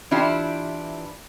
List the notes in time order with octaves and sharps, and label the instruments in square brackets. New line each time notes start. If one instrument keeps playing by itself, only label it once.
[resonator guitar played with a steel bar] E3 D4 E4 F4 G4